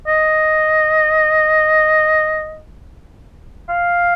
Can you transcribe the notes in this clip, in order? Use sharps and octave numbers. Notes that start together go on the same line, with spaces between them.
D#5
F5